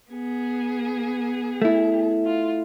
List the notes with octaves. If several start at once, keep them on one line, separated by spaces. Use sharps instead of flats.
B3 G#4
A3 E4
F4